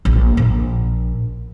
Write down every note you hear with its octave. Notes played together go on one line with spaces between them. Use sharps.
A#1
A#1